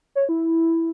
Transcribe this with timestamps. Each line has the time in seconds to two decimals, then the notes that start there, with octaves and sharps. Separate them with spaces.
0.15 C#5
0.29 E4